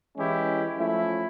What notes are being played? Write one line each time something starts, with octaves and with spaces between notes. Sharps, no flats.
E3 G#3 C#4 E4 G4
F3 A3 C#4 E4